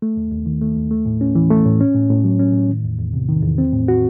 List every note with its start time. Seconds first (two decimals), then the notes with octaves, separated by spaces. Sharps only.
0.02 A3
0.17 D#2
0.31 D#2
0.46 D#3
0.61 A3
0.77 D#2
0.91 A3
1.06 A2
1.21 C#4
1.35 E3
1.50 A3
1.66 A2
1.80 C#4
1.95 A2
2.10 A2
2.24 F#3
2.39 C#4
2.54 A2
2.69 D#3
2.84 E2
2.98 E2
3.13 C3
3.28 D#3
3.43 E2
3.58 C4
3.72 A2
3.88 F#4